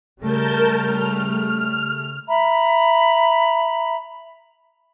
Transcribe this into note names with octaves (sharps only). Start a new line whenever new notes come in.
C#3 G3 A3 A#4 A5 G6
F6
E5 A#5 B5